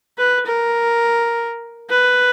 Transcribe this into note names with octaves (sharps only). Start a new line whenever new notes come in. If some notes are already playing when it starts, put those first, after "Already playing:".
B4
A#4
B4